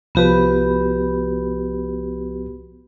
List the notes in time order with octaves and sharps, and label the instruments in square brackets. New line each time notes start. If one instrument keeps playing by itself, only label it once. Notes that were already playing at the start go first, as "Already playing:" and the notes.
[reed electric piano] C2 F3 B4 [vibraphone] B3 F#4 G4